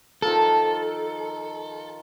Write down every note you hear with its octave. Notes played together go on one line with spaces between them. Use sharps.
D#3 F3 A4 A#4